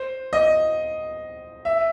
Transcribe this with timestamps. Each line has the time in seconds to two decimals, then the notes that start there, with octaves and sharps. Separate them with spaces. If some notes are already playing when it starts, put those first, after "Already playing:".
Already playing: C5
0.33 D#5
1.65 E5